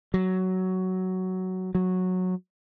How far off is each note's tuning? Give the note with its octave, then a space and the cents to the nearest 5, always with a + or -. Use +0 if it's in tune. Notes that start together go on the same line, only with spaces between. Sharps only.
F#3 +10
F#3 -10